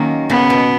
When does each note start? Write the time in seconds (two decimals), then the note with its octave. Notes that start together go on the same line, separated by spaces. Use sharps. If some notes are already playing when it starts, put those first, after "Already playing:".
Already playing: D#3 F#3 A#3 C#4
0.30 C#3 B3
0.50 B2